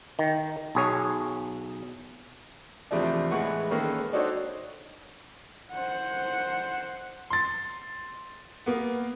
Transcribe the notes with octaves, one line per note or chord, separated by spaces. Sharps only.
D#3
B1 G#4 C#5
E2 C3 F3 A3 D4
A2 E3 G#3 B4 F#5 C#6
D#3 G#3 A#3 C#4 A4 B4
D4 D#4 F#4 A4 C5 C#5
C5 F#5
C6 A6
A#3 B3